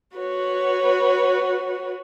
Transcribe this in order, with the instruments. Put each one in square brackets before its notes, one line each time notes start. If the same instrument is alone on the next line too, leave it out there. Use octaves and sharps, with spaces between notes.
[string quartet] F#4 B4 C#5